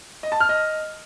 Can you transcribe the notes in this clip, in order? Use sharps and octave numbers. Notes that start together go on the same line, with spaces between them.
D#5
A5
F6
D#5